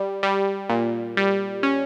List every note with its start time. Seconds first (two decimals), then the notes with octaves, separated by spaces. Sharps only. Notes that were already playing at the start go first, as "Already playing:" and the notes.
Already playing: G3
0.23 G3
0.70 A#2
1.17 G3
1.63 C#4